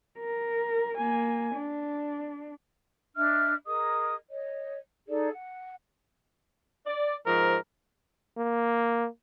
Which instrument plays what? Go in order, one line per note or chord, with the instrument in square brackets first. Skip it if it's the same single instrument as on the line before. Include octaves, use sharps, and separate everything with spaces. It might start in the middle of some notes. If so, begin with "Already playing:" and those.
[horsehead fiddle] A#4
A#3 G#5
D4
[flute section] D4 D#5 E5 F6
G#4 A#4 D#5 D#6
C#5 D#5
D#4 G#4 A4 D5
F#5
[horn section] D5
G#2 F3 A#4
[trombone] A#3